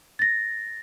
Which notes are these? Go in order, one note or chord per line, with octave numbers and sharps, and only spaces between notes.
A6 A#6